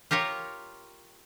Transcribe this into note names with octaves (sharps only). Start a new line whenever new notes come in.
F4 G4 A#4 C#5